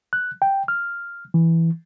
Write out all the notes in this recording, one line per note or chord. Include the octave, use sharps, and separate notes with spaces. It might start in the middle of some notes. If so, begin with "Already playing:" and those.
F#6
G5
F6
E3